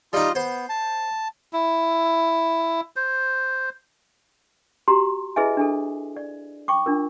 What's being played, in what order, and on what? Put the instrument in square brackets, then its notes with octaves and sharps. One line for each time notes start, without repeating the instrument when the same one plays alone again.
[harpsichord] G3 D#4 [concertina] F4 D#5
[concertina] B3 [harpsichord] C5
[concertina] A5
[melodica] E4
C5
[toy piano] F#4 G4 A#5 C6
E4 G#4 B4 D#5 E5 G#5
D4 G#4 A4
D5
G5 C#6 D6
D4 F4 A#4